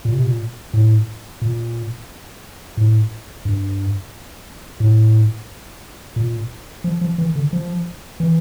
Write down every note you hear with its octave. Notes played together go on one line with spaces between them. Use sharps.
A#2
C3
A#2
A2
A#2
A2
G2
A2
A#2
F3
F3
E3
D3
F3
E3